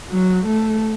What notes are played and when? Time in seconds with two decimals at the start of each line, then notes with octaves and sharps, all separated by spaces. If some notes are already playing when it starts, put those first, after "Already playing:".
0.10 F#3
0.46 A3